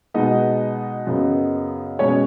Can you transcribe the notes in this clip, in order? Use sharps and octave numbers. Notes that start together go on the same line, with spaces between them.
B2 G#3 B3 D#4 D#5
F#2 C#3 B3
B2 G#3 B3 C#4 C#5